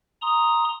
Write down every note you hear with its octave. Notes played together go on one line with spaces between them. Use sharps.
A#5 C6 D#6